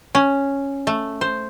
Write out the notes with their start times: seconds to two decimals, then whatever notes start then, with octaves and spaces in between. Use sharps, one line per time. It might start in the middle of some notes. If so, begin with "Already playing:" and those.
0.15 C#4
0.87 A3
1.21 C5